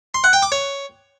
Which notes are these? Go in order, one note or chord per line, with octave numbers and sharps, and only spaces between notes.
C6
F#5
G5
D6
C#5